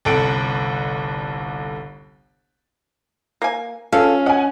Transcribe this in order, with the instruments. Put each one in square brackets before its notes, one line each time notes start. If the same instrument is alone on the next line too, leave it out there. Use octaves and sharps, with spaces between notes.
[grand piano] G1 C2 A4 F#5 D7
[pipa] A#3 G#5
[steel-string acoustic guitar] C#4 [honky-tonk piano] F4 [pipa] G#4 A4 F5
[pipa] D#5 [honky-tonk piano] F#5 G#5